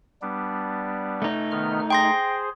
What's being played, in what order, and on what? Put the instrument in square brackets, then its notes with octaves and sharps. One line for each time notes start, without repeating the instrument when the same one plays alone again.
[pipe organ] G3 B3 D4
[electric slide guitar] A3 D#4
[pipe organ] D#3 B3 F6
[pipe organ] G#4 C5 [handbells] G5 C6 A#6